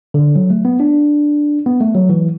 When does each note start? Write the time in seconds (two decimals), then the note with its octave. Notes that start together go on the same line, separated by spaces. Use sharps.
0.14 D3
0.36 F#3
0.50 A3
0.65 B3
0.80 D4
1.66 B3
1.81 A3
1.95 F#3
2.09 E3